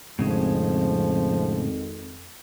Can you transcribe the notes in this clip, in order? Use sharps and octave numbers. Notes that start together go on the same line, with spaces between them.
G#1 F2 A2 C#3 F3 G#3